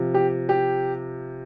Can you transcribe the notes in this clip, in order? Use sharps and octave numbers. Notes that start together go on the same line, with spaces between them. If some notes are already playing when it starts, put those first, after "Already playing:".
Already playing: C3 F3
G4
G4